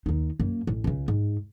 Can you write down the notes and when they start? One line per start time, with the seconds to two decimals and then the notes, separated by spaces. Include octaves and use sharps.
0.06 D#2 D#4
0.40 F#2 A#3
0.67 A1
0.84 C#2 C#3
1.08 G#2